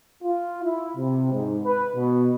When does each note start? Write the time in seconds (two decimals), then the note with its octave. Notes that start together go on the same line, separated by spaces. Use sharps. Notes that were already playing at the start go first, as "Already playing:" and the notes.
0.23 F4
0.64 E4
0.96 C3
1.33 G#2
1.63 B4
1.95 B2